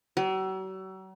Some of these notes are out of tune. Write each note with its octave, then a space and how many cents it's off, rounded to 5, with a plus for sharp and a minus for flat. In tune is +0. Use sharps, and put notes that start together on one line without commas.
F#3 +40